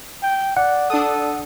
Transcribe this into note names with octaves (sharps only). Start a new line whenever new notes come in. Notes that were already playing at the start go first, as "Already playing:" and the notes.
G5
D5 F#5
D4 A4 D#6